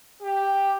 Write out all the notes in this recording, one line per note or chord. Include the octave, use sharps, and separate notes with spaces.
G4